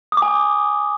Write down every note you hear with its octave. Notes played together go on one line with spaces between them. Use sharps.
D#6
D6
G#5